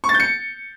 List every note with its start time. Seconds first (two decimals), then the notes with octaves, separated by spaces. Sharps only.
0.04 C#6
0.09 A6
0.14 G6
0.20 C#7